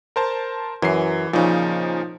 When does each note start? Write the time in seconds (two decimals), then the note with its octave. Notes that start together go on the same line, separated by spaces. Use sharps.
0.16 A#4 C5 A5
0.82 F#2 E3 C7
1.33 A#2 C#3 F3 D#4